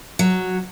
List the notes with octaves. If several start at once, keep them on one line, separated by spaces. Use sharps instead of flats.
F#3